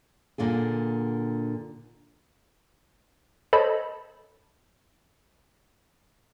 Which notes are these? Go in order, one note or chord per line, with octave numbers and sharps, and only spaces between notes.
A#2 D3 A#3 G#4
A4 C5 C#5 D#5 A5 B5